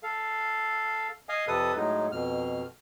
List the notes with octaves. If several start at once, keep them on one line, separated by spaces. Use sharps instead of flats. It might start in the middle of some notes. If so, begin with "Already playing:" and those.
A4 F5
D#5 F5 G#5 D#6
F2 C3 A4 B4 D#6
A2 F#3 G#3 D#4
F2 B2 F6